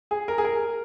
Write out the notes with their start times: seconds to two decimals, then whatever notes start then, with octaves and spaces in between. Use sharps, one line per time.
0.11 G#4
0.28 A#4
0.38 G#4
0.45 A#4